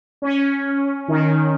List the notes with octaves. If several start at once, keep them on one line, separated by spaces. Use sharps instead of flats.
C#4
D#3